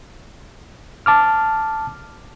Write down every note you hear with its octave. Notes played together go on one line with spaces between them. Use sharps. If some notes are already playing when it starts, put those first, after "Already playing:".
A5 D6 F6